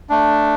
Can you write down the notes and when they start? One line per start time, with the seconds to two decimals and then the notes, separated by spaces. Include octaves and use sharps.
0.10 A3 D4